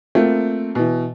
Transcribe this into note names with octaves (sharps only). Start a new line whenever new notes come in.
A3 A#3 C4 F4
B2 E3